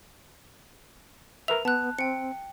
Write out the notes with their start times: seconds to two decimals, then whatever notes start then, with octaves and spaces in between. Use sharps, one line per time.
1.48 A#4 B4 E5 F7
1.65 B3 A5 F#6
1.99 C4 G5 C#7